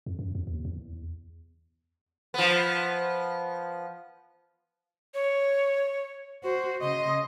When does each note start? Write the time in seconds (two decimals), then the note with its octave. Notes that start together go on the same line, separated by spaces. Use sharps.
0.06 F2
0.19 F#2
0.35 E2
0.47 D#2
0.65 E2
2.34 F3 B3
5.14 C#5
6.43 F#4 C5
6.82 C#3 D#5 C6